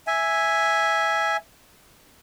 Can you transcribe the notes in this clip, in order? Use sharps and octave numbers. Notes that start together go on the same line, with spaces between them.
E5 G#5